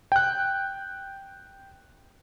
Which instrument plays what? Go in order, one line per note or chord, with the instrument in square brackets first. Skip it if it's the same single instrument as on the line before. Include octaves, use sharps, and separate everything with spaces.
[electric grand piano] G5 F#6